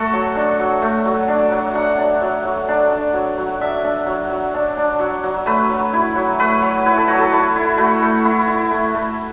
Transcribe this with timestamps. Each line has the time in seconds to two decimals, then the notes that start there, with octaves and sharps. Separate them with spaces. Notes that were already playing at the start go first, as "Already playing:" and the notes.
Already playing: A3 F#4 A4
0.13 F#3
0.36 D4
0.60 F#3
0.82 A3
1.05 F#3
1.28 D4
1.52 F#3
1.75 D4 F#5
1.98 D4
2.21 F#3
2.45 F#3
2.68 D4
2.92 D4
3.14 F#3
3.38 F#3
3.61 D4 E5
3.85 D4
4.07 F#3
4.30 F#3
4.54 D4
4.77 D4
5.00 F#3
5.24 F#3
5.46 A3 B4
5.70 F#3
5.93 E4
6.15 F#3
6.39 A3 B4
6.62 F#3
6.86 E4 B4
6.97 A4
7.08 F#3 F#4
7.19 A4
7.32 E4 A4
7.56 E4
7.78 A3 F#4
8.02 A3
8.25 E4 F#5
8.48 E4
8.71 A3
8.95 A3